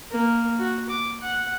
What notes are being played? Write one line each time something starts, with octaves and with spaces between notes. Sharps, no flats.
A#3
F#4
D6
F#5